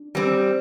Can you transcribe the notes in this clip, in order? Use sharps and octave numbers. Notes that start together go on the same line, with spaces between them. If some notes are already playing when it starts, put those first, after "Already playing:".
Already playing: D4
G3 C4